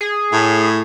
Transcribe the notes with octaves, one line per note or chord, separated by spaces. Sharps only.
G#4
A2